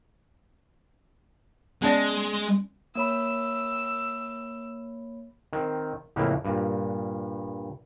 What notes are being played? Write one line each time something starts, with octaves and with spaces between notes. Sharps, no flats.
G#3 B3 C#4 D5
A#3 C#5 B5 E6
D#3 C4
F2 A2 C#3 E3 A#3
G2 A#2